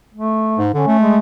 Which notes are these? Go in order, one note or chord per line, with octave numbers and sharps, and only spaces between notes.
A3
G#2
D3 C#4
A3
G#3